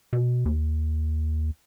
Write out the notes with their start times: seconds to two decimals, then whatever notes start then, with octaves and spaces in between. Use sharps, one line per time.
0.13 B2
0.45 D#2